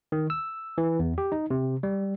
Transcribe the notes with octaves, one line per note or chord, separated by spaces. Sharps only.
D#3
E6
E3
E2
G4
D#4
C3
G3